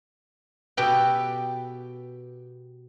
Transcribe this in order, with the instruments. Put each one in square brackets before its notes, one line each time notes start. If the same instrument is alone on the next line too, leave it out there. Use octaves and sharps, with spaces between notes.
[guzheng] B2 G4 A4 B4 G5